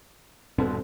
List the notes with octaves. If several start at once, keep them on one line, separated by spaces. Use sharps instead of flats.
D#1 G2 B2 C4 A4